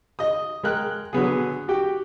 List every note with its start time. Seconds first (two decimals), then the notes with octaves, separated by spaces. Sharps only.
0.19 D#5 D#6
0.64 G#3 A#4 G5 F#6
1.13 D3 F#3 B3 G#4
1.68 F#4 G4 G5